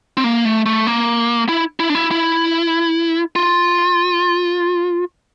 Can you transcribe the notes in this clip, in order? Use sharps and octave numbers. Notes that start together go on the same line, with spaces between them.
C4
A#3
A3
A3
A#3
E4
E4
D4
E4
E4
F4